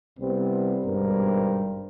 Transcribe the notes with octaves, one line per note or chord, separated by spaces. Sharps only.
C2 C3 G3 B3 C4
G#1 G2 B2 G3 A#4 C5